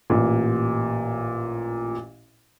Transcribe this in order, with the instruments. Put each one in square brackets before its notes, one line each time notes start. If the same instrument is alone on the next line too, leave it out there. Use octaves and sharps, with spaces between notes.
[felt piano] A1 A#2